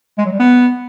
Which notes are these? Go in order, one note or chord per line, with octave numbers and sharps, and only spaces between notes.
G#3
F#3
G3
B3